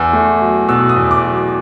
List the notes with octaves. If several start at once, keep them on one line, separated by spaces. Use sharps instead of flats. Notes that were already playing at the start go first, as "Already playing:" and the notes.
Already playing: E2 E6
A3
F#3
B2 E6
D#6
E2
D6
F#3